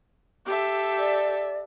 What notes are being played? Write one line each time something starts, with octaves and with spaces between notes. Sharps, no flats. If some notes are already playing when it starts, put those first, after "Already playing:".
G4 A4 E5
D5